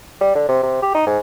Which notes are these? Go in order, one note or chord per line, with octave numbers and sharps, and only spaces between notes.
G3
D3
C3
C3
G4
D#4
G#2